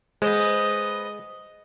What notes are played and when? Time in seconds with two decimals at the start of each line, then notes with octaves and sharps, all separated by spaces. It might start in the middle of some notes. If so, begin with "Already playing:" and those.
0.22 G#3 B3 C5 D#5